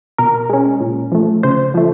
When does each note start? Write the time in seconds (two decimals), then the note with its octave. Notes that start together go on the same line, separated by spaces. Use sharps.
0.18 B2 A#4
0.49 G#3 C#4
0.80 A#2
1.12 F3 A3
1.43 C#3 C5
1.74 F3 A3